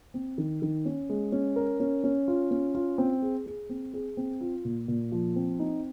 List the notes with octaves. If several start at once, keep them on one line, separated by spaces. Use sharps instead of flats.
C4
D#3
D#3
C#4
G#3
C#4
A#4
C#4
C#4
F4
C#4
F4
C4
G#4
G#4
C4
G#4
C4
F4
A#2
A#2
F3
C4
D#4